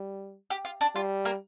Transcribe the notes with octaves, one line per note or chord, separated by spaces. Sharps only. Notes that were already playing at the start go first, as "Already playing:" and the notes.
Already playing: G3
G4
F4
D4
G3 F4
A#3 A#4